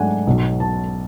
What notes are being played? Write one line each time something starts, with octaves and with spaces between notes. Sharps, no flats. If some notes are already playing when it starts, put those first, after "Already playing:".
Already playing: G#2 F#3 A3 D4 F#5 G#5
B1 B2 F#3
A5